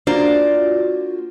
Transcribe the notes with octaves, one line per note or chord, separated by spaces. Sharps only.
A#3 D4 F4 F#4 C5 D5